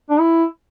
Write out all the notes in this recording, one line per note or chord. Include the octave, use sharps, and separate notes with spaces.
D4
E4